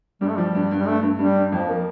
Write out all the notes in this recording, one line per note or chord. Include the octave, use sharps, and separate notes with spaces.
G2 G3
A3
F3 G3
G2
G2
G3
G2 A3
G2
G2 G3
G2
F2 F3
A#3